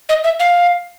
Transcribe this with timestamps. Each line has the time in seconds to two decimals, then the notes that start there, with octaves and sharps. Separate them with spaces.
0.09 D#5
0.24 E5
0.40 F5